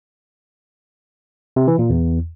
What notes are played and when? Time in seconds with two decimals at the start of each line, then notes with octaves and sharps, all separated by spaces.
1.56 C3
1.68 E3
1.79 A#2
1.90 E2